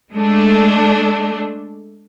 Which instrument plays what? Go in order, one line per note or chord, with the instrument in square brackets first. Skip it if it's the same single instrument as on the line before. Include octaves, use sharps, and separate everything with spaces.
[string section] G#3 A3 D4